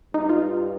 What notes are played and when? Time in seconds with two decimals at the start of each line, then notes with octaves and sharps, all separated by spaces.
0.14 G2 D#4
0.29 F4